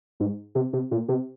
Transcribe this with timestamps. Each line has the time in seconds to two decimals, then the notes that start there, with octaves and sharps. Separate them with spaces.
0.20 G#2
0.55 C3
0.73 C3
0.91 A#2
1.08 C3